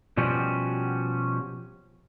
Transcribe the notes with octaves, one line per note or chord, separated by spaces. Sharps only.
B2 F3 G3 C#4 F#4 G4